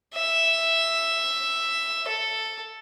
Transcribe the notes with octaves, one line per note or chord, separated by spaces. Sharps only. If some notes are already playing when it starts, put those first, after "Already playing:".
E5
A4